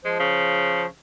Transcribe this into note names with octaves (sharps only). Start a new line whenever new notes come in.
F3 G#3 C5
C#3